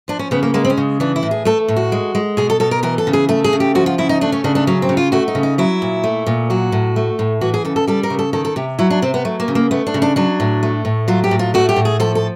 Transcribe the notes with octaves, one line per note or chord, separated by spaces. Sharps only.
F3 D4
C#4
C#3 B3
A#3
G#3 A#3
C4
C#4
C#3
E3 D4
E4
A2
G#4
A3 A4
A2
F#4
G#3
G#3
B2 G#4
A4
B2 A4
A#4
E3 A#4
A4
C#3
G#4
A3 A4
G#4
C#3
G4
F3 F#4
F4
C#3 E4
D#4
A3 D4
C#4
C#3 D4
D4
F#3 C#4
C4
C#3
F4
A3 F#4
D#4
C#3
D#4
F#3 E4
A#2
A3
A#2
F#3 F#4
A2
A3
A2
E3 F#4
G#4
C#3 A4
A4
G3 A4
A#4
C#3
A4
D#3 A4
A4
C3 G4
F#3 E4
D4
C3 C4
B3
F#3 A3
A#3
C#3
A#3
A3 B3
D4
C#3
D4
F#3 D4
A2
A3
A2
F#3 F4
G4
A2
F4
A3 F#4
G4
A2
G#4
F3 A4
A4